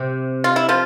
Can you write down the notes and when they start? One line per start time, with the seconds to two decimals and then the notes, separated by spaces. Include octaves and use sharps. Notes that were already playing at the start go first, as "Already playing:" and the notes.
Already playing: C3
0.44 F4
0.56 E4
0.69 F3 F4